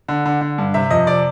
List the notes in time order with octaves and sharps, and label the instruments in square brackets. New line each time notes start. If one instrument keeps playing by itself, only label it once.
[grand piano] D3
D3
D3
G2
C3 E5
F2 D#5
C3 D5